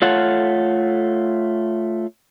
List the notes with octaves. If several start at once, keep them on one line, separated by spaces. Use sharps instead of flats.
A3 F4 A4 C#5 F5 F#5